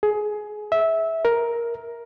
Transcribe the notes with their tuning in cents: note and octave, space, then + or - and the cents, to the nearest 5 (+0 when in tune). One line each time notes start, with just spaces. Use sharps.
G#4 +20
E5 -15
A#4 +10